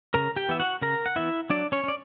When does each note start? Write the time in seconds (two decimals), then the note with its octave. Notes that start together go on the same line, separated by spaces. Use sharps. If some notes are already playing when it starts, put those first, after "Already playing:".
0.14 C#3 A#4 A#5
0.36 G4 G5
0.49 E3 B3 E5
0.60 F#4 F#5
0.82 C#3 A#4 A#5
1.06 F#5
1.16 E3 B3 E4 E5
1.50 F#3 D4 D5
1.72 C#4 C#5
1.84 C#4
1.88 D5